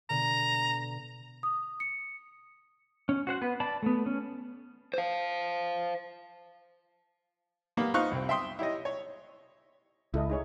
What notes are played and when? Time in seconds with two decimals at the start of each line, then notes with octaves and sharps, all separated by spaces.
0.09 B2 D3 B3 A#5
1.43 D#6
1.80 C#7
3.09 C#4
3.27 F#4 C5 F#5
3.42 B3 B4
3.60 D5 A5 B5
3.83 A3 B3
4.06 C#4
4.94 C5 F5
7.77 G3 A#3 B3
7.94 B3 D#4 F4 C5 C#6 F#6
8.11 C2 C4
8.29 E5 G5 C6 D#6
8.59 E4 G4 C#5 D#5
8.85 C#5
10.14 C#2 E4 A4 D#5
10.30 D#4 G#4 C#5